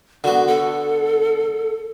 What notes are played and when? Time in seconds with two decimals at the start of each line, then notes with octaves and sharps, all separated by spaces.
0.24 D3 B3 F#4
0.47 A4